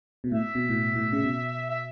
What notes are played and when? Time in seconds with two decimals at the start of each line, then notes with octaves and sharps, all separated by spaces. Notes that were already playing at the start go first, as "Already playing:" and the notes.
0.24 B2
0.32 A2 E5
0.55 B2
0.69 A2
0.95 A2
1.12 C#3
1.23 B2
1.70 E5